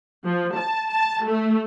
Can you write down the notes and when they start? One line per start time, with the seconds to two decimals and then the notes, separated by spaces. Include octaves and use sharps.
0.25 F3
0.56 A5
0.90 A5
1.26 A3